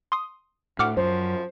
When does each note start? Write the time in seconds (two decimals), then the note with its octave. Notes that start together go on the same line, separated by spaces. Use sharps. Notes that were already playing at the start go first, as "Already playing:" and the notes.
0.12 C6 D#6
0.79 D2 A2 F#5 D6 F6
0.97 F#2 F3 C5